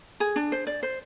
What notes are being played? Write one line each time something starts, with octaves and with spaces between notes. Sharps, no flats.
G#4
D4
C5
D5
C5